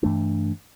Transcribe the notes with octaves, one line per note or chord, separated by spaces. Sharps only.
G2 E3 A3 D4